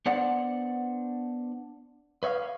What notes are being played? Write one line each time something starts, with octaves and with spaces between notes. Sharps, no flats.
B3 D4 C5 D5 F#5
B4 C#5 E5 F5